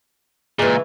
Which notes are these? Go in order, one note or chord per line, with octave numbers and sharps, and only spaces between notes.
A#2 C#3 E3 G#3